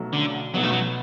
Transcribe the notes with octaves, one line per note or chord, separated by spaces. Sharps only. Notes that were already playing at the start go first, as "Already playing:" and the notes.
Already playing: B1 B2 F#3 A3
D3
B1 B2 F#3 B3
A3
F#3